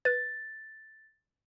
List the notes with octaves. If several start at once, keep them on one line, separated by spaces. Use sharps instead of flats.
B4 A6